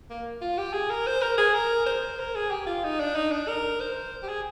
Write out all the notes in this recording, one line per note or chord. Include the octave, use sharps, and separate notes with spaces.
A#3
F4
G4
G#4
A#4
C5
A#4
G#4
A#4
C5
A#4
G#4
G4
F4
D#4
D4
D#4
D4
A#4
C5
G4
G#4